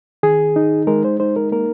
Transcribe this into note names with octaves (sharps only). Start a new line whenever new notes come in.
D#3 G#4
D#4
G#3 A#4
C5
D#4 C5
A#4
A#3 A#4